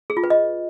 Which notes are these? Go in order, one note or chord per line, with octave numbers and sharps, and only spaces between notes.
G#4
F4
B4
D#5